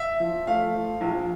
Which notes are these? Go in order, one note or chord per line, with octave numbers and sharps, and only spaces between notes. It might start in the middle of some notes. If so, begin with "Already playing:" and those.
Already playing: E5
F3
A3 F5
F3
A#1